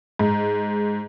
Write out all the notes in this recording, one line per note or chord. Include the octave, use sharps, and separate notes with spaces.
G#2